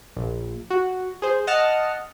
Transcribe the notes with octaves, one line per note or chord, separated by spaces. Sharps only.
A#1
F#4
G#4 C5
D#5 F#5 A5 F6